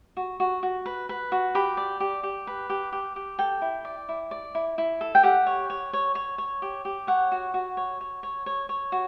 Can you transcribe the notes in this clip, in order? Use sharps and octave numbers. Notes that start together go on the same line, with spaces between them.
F#4
F#4
F#4
B4
B4
F#4
G4 B5
D5
G4
G4
B4
G4
G4
G4
A4 G5
E4
D5
E4
D5
E4
E4
A4
G5
G4 F#5
C#5
C#5
C#5
C#5
C#5
G4
G4
C#5 F#5
F#4
F#4
C#5
C#5
C#5
C#5
C#5
F#4